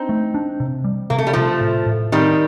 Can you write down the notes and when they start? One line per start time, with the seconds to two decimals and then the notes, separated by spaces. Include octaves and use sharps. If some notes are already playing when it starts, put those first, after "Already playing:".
Already playing: C4 D4 D#4
0.09 A3
0.34 D4
0.60 C3
0.84 G3
1.10 C3 A#3
1.18 A3
1.27 G3
1.33 C3 F3 A3
1.61 A2
1.86 A2
2.12 D#3 G3 C4